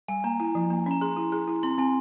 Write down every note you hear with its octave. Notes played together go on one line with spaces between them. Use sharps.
G3 G#5
A#3 A#5
E4
F3
A#3
C#4 A#5
G#4 C6
E4
G#4
E4
C4 C6
C4 G#5